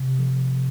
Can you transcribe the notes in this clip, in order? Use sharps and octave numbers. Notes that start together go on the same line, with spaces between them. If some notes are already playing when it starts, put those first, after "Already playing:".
Already playing: C3
F3